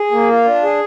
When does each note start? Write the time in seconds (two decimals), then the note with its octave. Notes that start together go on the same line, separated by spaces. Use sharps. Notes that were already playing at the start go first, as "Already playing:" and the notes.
Already playing: G#4
0.11 A#3
0.29 F4
0.45 D4
0.63 G#4